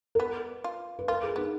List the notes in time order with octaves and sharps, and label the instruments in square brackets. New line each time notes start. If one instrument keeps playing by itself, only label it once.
[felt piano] A#4
[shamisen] B3 [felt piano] B4
[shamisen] F4
[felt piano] B4
[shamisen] F4 [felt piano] A#4
[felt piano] G#4
[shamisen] B3 [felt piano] D#4